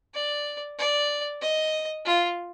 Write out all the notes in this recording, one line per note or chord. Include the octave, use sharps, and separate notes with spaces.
D5
D5
D#5
F4